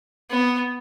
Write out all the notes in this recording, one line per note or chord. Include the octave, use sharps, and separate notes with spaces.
B3